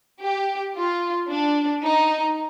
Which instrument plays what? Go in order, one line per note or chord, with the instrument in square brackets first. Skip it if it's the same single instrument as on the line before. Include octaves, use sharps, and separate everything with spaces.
[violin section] G4
F4
D4
D#4